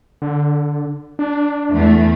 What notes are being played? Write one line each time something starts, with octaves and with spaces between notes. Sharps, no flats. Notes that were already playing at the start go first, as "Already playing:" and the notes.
D3
D4
E2 A3